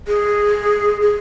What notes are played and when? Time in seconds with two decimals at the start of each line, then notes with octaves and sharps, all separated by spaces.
0.08 G#4
1.01 G#4